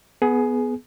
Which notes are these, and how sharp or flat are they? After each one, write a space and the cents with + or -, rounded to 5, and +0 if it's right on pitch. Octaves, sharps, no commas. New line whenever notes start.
B3 +0 G#4 +20